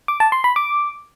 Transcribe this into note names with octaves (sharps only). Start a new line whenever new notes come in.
D6
A5
C6
B5
D6